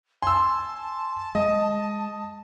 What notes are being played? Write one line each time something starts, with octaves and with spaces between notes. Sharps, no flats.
G#5 A5 C6 E6
G#3 D#5